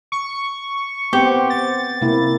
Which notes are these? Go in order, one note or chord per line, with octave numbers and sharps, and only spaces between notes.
C#6
B3 C4 G4 C5
A6
C3 A#3 E4